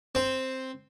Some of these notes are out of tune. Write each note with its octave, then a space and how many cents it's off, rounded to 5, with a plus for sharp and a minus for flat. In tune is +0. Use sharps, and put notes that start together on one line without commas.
C4 +0 C5 +0